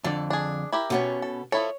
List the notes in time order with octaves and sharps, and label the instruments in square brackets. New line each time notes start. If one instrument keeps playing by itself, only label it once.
[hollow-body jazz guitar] F2 D3 [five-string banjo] A4 D5
[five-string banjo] D4 G#4
E4 G4 A#4
[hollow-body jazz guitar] B2 B3 C#4
[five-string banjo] A4
[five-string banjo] F3 E4 A4 [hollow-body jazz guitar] C#5